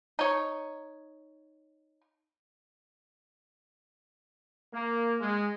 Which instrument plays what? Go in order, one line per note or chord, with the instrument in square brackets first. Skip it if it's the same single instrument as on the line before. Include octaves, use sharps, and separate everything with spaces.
[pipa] D#4 C#5
[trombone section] A#3
G#3